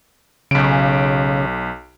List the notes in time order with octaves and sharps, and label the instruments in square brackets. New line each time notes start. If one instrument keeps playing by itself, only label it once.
[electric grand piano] B1 D7 [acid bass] C#3